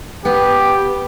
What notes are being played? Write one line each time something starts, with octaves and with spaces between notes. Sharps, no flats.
B3 G4